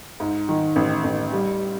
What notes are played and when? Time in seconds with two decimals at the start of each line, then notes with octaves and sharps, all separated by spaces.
0.20 G#2
0.49 D#3
0.76 A1
1.04 A1
1.32 G3